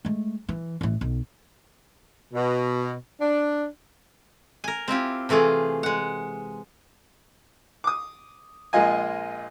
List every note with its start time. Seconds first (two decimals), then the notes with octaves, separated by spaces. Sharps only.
0.05 G#3 A3
0.49 E3
0.81 A1 E3
1.01 B1
2.33 B2
3.20 D4
4.64 A#4 G#5
4.88 C4 E4 F4 G4
5.29 C3 E3 A3 F4 G#4
5.83 G#3 F#5
7.84 D6 D#6
8.73 A#1 G#3 A#3 F4 D#5 G#5